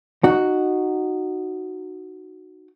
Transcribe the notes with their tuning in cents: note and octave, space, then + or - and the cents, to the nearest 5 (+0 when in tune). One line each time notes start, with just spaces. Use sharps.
D#4 -15 F#4 +0